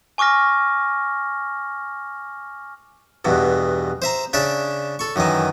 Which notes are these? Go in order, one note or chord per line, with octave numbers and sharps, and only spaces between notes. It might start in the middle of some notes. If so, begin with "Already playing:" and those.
G#5 C#6 D6 F6 A#6
E2 G2 B2
C5 E5 A#5
C#3 D4 D5 E5
A4 C#6
F#2 D#3 E3 D#4